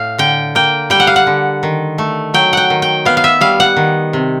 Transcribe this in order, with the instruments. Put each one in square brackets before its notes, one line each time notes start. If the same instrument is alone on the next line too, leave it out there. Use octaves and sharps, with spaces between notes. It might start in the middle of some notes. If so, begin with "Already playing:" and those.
Already playing: [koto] A2 F5
D3 G5
A#3 G5
G3 G5
F#5
F5
F#5
D3
D#3
A3
F#3 G5
F#5 G5
D#3
G5
B3 F5
F5
E5
G3 F5
F#5
D#3
C3